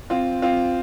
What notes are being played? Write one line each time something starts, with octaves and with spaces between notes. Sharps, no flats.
C4 F4
C4 F4